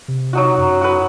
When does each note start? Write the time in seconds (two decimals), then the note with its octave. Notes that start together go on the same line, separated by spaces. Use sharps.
0.08 C3
0.33 F#3 D#4 F#4
0.58 F#2
0.81 F#4 B4